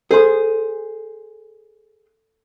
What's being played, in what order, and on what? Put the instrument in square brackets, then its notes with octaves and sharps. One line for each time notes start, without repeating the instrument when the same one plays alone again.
[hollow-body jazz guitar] G#4 C5 [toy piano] A4 C6